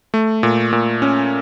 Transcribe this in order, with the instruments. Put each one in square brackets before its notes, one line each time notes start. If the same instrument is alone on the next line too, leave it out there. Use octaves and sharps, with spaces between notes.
[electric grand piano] A3
A#2
A#2
C#4